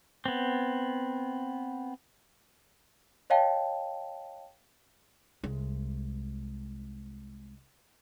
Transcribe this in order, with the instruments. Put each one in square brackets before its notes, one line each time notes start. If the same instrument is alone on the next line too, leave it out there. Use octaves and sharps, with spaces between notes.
[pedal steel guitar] B3 C4
[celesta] C#5 D#5 F5 G5 A5
[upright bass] C2 G#3